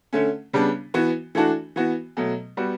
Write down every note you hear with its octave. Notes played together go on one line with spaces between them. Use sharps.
D3 A3 C#4
C#3 G3 B3 D4
E3 B3 F#4
E3 A3 D4 F#4
E3 B3 F#4
B2 F#3 A3
G3 B3 F#4